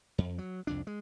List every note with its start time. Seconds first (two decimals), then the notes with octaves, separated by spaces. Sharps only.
0.18 F2
0.38 F#3
0.67 C2 F2 D4
0.87 G#3